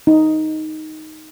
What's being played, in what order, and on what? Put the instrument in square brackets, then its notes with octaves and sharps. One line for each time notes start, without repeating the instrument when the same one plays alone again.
[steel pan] D#4